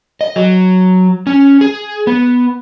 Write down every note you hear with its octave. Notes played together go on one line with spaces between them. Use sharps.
D#5
F#3
C#4
G#4
B3